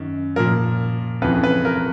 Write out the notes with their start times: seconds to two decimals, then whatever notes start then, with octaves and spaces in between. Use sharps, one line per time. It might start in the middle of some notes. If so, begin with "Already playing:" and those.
Already playing: F#2 D#3
0.36 A#2 F3 A#4
1.22 F2 C#3 E3 B4
1.44 B4
1.65 A#4